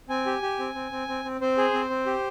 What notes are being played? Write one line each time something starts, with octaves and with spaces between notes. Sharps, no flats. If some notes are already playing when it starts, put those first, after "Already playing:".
C4 G#5
G4
G4
C4
C4
C4
C4
C4
C4 C5
G#4
C4
C4
G4